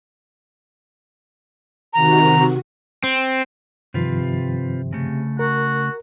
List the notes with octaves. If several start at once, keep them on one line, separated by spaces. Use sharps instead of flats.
C3 D#3 F#4 A#5
C4
G2 C3 D#3 F3 C4 F4 B4
C#3 A3
F#4 A#4